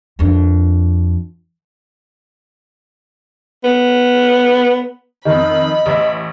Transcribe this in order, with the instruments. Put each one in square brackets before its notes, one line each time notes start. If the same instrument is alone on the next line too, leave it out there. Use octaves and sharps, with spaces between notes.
[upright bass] F2 D4
[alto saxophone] B3
[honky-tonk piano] F2 D#3 [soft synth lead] D#5 [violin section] B5
[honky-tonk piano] A1 E5